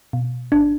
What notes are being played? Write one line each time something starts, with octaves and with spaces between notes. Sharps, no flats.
B2
G1 D4